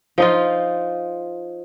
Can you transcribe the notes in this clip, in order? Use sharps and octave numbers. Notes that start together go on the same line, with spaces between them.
F3 D#4 F4